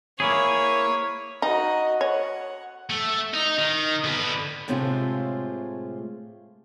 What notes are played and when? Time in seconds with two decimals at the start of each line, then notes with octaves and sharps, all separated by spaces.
0.20 A#3 E4 G#4 C#5
1.42 D#4 F#4 D#5
2.01 C#5 F#5
2.90 A3
3.34 D#4
3.58 D#3
4.04 D3 B3
4.68 A2 C3 G#3 A3 F4